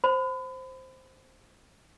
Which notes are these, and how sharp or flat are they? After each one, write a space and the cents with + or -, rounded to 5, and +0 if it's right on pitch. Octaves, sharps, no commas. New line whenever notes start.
C5 +0 B5 +35